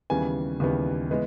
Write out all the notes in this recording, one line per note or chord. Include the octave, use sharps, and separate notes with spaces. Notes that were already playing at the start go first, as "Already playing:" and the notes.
D#2 C#3 E3 G3 B3 G#5
D#2 C#3 E3 G3 B3
E3 G#3 B3